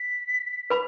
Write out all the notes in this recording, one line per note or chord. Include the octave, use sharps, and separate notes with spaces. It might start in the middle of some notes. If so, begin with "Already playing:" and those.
Already playing: B6
B4 B5